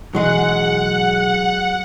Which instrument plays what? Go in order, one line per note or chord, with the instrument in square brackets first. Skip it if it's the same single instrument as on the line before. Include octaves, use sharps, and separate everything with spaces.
[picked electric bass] B1 E3 [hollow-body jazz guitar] F#3 G#3 G#4 [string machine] F#5